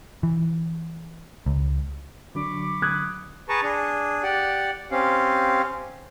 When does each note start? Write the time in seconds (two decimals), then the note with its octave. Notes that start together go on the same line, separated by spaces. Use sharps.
0.23 E3
1.46 C#2
2.35 D3 F#3 D4 B5 C#6 D6
2.82 D#6 F#6 G#6
3.49 G#4 B4 A5 A#5 C#6
3.63 D4 G#4
4.23 G4 D5 F#5
4.91 C4 C#4 G4 F5